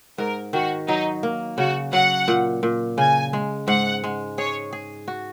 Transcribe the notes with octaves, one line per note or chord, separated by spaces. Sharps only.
G#2 A#4
D#3 F#4
F#3 D#4
A#3
C#3 F#4
F#3 F#5
A#2
A#2
C#3 G#5
G#3
G#2 F#5
G#3
G#4 C#5
G#4
F#4